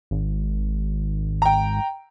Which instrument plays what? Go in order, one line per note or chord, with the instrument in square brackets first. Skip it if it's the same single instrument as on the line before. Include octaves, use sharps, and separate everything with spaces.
[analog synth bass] G#1
[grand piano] G5 A#5